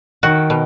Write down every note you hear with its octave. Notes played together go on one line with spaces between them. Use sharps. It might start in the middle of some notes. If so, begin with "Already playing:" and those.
D#3 F#4
B2